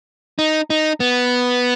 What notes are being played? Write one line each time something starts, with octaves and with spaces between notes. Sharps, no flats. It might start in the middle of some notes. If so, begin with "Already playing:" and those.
D#4
D#4
B3